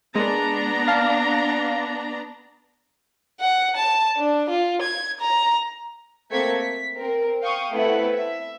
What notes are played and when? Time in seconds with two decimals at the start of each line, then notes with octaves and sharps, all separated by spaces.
0.15 G#3 B3 D4 A#5
0.88 F5 A5
3.41 F#5
3.76 A5
4.17 D4
4.49 F4
4.82 G#6
5.21 A#5
6.31 A3 A#3 C4 G#6 B6 C#7
6.61 B6
6.95 C4 A#4
7.42 F5 G5 C#6 D#6
7.72 A3 B3 C4 E4 B4 F#5
8.13 E5